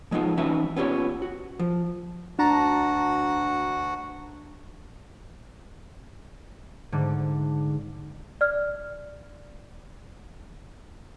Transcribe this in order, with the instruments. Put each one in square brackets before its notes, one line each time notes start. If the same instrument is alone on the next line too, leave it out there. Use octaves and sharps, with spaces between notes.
[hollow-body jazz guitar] F3 G#3 B3 D#4 F4
E3 C#4 D#4 F#4 B4 E5
B3 C#4 F4 G4 C#5
F#4
F3
[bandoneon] D2 F#4 F#5 [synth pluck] D4 A5 A#5
[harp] G#2 D3 A3
[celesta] D5 F6